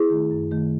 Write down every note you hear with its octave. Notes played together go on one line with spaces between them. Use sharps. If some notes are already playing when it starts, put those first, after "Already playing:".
Already playing: E4 G#4
D#3 A3
F#2
D#3 A3